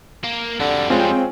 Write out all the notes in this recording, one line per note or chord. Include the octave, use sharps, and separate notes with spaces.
A#3
F2 D3 G3
G#3 C4 C#4 F4